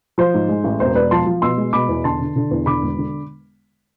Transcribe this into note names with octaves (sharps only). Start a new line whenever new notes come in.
F3 C5
G#2
G#3
A1
E1 C5
E1 B4 D5
F3 A5 C6
F3
B2 C6 E6
G#3
B2 B5 D6
E2
D3 A5 C6
D3
D3
E2
D3 B5 D6
E1
D3